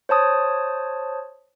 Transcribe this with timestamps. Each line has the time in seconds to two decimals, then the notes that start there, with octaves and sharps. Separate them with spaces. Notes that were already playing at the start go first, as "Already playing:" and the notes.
0.09 C5 C#5 A5 D#6